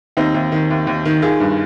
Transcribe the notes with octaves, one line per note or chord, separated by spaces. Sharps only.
D#2 C4 D#4
D#2
D#3
D#2
D#2
D#3
D#3 F4 G#4
G2